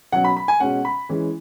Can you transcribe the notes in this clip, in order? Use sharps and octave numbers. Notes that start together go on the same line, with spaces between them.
B2 F#3 C#4 F#5
B5
B5
G#5
B2 G#3 C#4 F#5
B5
E3 G#3 C#4